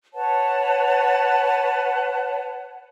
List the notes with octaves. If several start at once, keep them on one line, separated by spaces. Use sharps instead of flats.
B4 C#5 F#5 A5